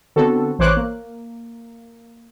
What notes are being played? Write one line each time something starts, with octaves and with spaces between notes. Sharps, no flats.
D3 B3 C4 F#4 A4
A1 E3 C5 C#5 D6 F#6
A#3